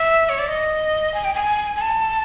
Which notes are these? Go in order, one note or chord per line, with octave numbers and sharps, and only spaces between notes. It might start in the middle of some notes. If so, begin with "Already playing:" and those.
Already playing: E5
C#5
D5
D#5
G#5
G5
G#5
G#5
A5